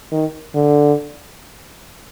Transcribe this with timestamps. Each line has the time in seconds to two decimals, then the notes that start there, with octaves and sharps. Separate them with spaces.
0.12 D#3
0.55 D3